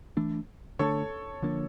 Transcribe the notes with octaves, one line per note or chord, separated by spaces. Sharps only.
E3 A3 D4
D3 A3 D4 A4 C#5
D3 F3 A#3 D4